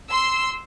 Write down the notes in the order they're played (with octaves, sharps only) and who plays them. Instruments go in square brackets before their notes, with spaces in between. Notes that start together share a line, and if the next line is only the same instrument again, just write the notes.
[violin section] C6 E6